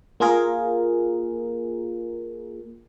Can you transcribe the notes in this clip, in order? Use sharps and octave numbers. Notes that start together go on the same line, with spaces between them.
A#3 F4 G#4 A#4